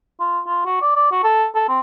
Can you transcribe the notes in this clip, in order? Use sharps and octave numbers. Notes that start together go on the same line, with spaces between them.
F4
F4
F#4
D5
D5
F#4
A4
A4
C4